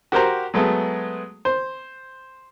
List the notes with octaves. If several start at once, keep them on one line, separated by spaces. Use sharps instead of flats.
F#4 G4 A#4 C5 A#5
F#3 G#3 A3 B3
C5